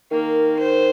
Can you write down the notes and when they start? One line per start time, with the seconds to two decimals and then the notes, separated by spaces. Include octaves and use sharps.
0.11 D#3 A#3
0.59 C5